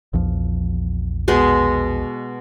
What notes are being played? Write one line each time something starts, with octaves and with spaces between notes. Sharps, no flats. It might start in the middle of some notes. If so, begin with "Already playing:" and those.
A#1 E2 F3
B2 G#3 D#5